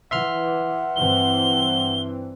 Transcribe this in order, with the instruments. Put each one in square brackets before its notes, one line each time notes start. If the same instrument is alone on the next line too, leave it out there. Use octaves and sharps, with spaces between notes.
[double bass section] E3 [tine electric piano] E5 C6 F6 [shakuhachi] F#5
[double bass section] G2 E3 C4 [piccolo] G7